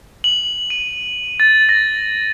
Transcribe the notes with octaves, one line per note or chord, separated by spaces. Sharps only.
F#7
D#7
A6
A#6